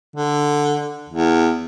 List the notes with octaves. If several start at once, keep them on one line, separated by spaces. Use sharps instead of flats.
D3
E2